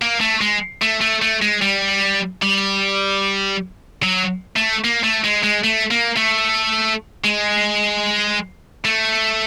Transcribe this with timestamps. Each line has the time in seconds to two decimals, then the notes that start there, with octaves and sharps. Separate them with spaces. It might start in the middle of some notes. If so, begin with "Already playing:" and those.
0.02 A#3
0.21 A3
0.41 G#3
0.82 A3
1.01 A3
1.22 A3
1.42 G#3
1.62 G3
2.42 G3
4.03 F#3
4.56 A3
4.84 A#3
5.03 A3
5.24 G#3
5.44 G#3
5.64 A3
5.91 A#3
6.17 A3
7.24 G#3
8.85 A3